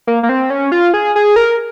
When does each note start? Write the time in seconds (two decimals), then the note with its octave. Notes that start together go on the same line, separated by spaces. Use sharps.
0.07 A#3
0.23 A#3
0.29 C4
0.50 C#4
0.72 F4
0.94 G#4
1.16 G#4
1.36 A#4